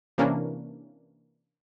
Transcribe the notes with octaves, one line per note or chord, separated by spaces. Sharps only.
C3 E3 A#3 C#4 D4